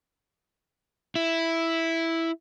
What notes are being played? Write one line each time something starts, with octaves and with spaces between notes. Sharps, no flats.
E4